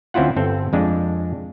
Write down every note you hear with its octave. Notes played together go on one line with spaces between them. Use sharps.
D2 C4 C#4 E4 F4 F#5
G1 C4 A4
F2 G#3 D4